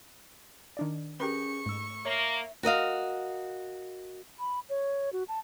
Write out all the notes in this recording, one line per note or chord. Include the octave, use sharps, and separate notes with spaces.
D#3 D4 D5
C#4 G4 G#4 A#4 B4 C#6
G#2 A3 E6
A#3 C#5 E5
F#4 A#4 D#5 F5
B5
C#5
F#4
A5